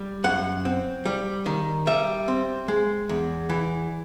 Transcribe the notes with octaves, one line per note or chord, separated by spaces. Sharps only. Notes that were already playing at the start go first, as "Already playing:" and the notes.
Already playing: G3
F#2 F#5
C4
G3
D#3
G3 E5
C4
G#3
E2
E3